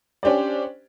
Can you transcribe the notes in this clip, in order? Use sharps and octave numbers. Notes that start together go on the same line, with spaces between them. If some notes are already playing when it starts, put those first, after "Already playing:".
C#4 D4 G4 C5 D5